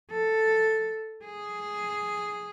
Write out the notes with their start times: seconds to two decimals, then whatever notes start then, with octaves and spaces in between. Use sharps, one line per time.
0.10 A4
1.24 G#4